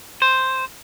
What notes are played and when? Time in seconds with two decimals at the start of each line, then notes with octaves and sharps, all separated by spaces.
0.22 C5